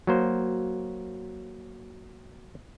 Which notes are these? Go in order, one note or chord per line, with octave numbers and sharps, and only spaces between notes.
F#3 A#3 C5